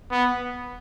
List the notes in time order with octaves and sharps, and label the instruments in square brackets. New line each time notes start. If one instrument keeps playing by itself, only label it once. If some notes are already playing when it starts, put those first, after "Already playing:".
[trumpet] B3